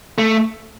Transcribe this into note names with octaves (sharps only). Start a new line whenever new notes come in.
A3